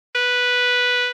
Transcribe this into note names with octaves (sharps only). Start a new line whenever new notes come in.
B4